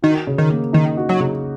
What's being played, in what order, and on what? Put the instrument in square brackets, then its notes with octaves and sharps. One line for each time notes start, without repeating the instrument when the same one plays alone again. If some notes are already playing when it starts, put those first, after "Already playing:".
[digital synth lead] D#3 [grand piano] F#4
[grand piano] C#3
[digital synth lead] D#3
[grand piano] A#3
[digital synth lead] D#3 [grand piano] D#4
[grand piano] F#4
[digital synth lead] F#3
[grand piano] C#3